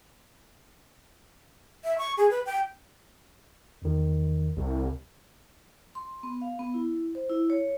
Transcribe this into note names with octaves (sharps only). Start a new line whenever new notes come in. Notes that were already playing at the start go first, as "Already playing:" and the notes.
E5
C#6
G#4
B4
G5
E2 D#3
C2
C6
B3
F5
B3
E4
C5
E4
C#5